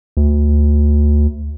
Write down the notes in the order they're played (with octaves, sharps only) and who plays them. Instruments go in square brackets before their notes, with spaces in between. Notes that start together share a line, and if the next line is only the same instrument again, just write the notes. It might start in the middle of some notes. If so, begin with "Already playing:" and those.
[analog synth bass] D2